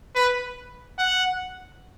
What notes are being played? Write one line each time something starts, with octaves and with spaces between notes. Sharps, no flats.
B4
F#5